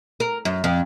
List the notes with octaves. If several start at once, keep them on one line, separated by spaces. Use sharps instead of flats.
A#4
F#2
F2